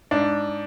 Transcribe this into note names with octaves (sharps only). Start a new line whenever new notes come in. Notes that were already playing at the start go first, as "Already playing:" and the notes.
G#2 D4